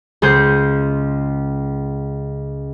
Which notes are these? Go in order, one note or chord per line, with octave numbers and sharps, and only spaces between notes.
C#2 G#4 C5 G6 C7 C#7